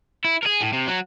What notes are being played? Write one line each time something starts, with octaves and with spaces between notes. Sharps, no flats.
E4
G#4 A#4
A2
C3
F#3 F#4